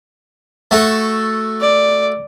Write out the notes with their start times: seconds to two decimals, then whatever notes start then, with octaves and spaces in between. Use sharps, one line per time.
0.71 A3 F#4 A4
1.61 D5